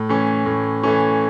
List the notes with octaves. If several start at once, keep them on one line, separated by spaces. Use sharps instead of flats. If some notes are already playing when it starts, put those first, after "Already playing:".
Already playing: A2
E3 A3 C#4
A2
E3 A3 C#4